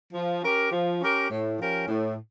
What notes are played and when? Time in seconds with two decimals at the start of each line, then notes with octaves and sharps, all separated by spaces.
0.14 F3
0.43 C#4 G4 A#4
0.72 F3
1.01 C#4 G4 A#4
1.30 A2
1.59 F3 C#4 G4 A#4
1.88 A2